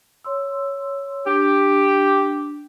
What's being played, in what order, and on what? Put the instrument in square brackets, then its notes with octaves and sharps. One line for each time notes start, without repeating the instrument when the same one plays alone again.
[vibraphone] C#5 C6 E6
[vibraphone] D4 [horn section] G4